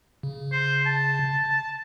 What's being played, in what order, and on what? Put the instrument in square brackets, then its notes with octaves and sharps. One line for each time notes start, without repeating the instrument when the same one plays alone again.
[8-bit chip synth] C#3
[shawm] C5
A5